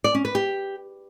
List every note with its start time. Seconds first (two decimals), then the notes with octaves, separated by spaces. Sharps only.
0.04 D5
0.15 C#4
0.25 B4
0.35 G4